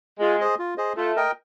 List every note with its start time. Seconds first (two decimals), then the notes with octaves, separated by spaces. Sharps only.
0.20 G#3 F4
0.40 G#4 C5 D#5
0.59 F4
0.78 G#4 C5 D#5
0.97 A3 F4
1.16 A#4 D#5 G5